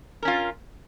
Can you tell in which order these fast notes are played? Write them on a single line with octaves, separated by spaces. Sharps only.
A#4 C#4 F4